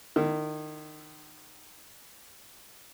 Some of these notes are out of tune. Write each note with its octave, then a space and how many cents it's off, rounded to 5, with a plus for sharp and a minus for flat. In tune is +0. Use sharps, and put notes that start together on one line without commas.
D#3 -25 E4 +0